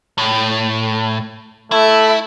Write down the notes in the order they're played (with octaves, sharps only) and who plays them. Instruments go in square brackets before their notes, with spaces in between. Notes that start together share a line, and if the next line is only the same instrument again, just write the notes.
[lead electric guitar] A2
[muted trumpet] A3 [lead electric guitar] E4